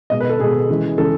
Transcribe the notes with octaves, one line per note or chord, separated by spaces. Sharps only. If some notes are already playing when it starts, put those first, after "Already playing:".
B2 G#3 D#5
B4
A4
B2 G#3 G#4
C#3 E3 G#3
C#3 E3 G#3 A4